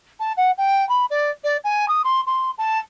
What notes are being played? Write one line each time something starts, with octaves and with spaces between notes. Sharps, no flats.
A5
F#5
G5
B5
D5
D5
G#5
D#6
C6
C6
A5